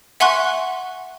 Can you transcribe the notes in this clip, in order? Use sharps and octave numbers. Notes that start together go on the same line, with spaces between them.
E5 F#5 G#5 C6 C#6 F#6